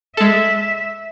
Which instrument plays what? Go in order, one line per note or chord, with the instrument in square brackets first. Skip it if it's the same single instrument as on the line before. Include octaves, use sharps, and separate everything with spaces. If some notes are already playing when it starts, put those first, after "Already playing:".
[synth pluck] G#3 A4 [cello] E5